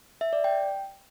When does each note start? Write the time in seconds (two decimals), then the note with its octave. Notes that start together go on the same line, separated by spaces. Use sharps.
0.21 E5
0.33 D5
0.44 G5